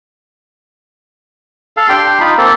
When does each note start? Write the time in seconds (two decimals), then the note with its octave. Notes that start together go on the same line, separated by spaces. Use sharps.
1.77 A4 F5
1.89 D4 G4 G5 C6
2.20 D#4 F4 B5
2.37 A#3 C4 A4